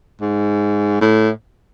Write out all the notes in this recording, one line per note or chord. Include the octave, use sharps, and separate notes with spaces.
G#2
A2